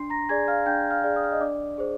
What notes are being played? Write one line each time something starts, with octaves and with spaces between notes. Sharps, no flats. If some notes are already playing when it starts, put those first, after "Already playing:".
Already playing: D4 C6 C7
A#5 A#6
G#4 D5 G#5 G#6
F5 F6
D4 G5 G6
F5 F6
G#4 D5
D#6
F6
D#5 D#6
D4 D5 D6
G#4 C5